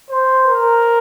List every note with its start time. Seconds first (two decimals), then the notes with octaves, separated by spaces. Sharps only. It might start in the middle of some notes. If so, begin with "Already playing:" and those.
0.09 C5
0.46 A#4